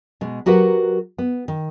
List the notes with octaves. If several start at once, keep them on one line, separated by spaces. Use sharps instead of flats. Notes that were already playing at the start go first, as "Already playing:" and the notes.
B2 G#3
F#3 F#4 G4 A#4 B4 F#5
B3
D#3